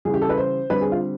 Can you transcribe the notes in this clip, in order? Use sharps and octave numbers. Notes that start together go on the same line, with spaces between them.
C#3 E3 G3 G#4
G4
A4
B4
C5
D3 G3 C4 B4
G#4
F4